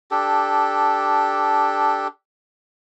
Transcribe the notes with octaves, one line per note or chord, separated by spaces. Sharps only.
D4 G4 A4